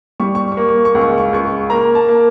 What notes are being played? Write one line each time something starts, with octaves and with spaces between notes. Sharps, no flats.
G3 C#6
C#6
C#6
A#3
C#6
C#6
C#2
C#6
C#6
C#2 C#6
A#3 A#5
A5
A#3